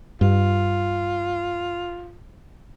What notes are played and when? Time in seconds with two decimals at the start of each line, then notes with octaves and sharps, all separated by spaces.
0.21 G2 F4